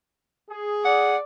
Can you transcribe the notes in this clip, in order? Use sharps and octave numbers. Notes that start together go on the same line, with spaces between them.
G#4
D5 F#5